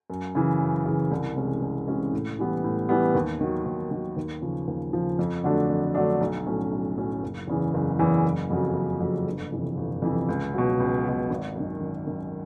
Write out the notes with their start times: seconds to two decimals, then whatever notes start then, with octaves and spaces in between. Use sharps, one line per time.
0.10 F#2
0.35 C#3 E3
0.60 F#2
0.86 C#3 E3
1.11 C2
1.37 C3 E3 G#3 C#4
1.62 C2
1.88 C3 E3 G#3 C#4
2.13 A2
2.39 E3 G3 B3
2.64 A2
2.89 E3 G3 B3
3.15 D#2
3.41 D#3 F#3
3.66 D#2
3.91 D#3 F#3
4.17 D#2
4.42 C#3 F3
4.68 D#2
4.93 C#3 F3
5.19 F2
5.44 D3 F#3 A3 D4
5.70 F2
5.95 D3 F#3 A3 D4
6.21 B1
6.47 A2 F#3 A3 C#4
6.71 B1
6.97 A2 F#3 A3 C#4
7.23 F#1
7.48 E2 C#3 E3
7.74 F#1
7.99 E2 C#3 E3
8.25 F#1
8.50 F2 C#3 F#3
8.75 F#1
9.00 F2 C#3 F#3
9.26 G1
9.52 F2 C3 E3
9.77 G1
10.02 F2 C3 E3
10.29 C#2
10.54 B2 F#3
10.80 C#2
11.04 B2 F#3
11.30 G#1
11.55 F#2 D#3
11.81 G#1
12.07 F#2 D#3